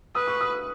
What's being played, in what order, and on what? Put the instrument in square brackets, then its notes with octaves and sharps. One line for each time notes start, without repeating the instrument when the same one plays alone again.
[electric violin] B4 [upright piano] D#6
[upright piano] C#6
D#6